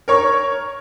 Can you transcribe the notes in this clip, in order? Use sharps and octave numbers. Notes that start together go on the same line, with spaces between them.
A#4 C#5 C#6